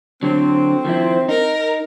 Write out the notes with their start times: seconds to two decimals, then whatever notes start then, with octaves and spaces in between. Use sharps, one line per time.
0.23 D3 F#3 C4
0.85 D#3 F3 E4
1.29 D#4 A#4